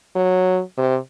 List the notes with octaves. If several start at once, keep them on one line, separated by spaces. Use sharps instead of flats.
F#3
C3